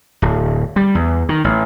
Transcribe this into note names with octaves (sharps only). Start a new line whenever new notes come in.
D1
G3
E2
D#3
A1